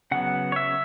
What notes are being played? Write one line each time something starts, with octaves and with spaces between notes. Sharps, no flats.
C#3 F#3 B3 F#5
C#5
E5